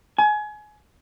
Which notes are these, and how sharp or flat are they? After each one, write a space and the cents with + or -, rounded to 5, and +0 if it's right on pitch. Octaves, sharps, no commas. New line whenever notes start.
G#5 +25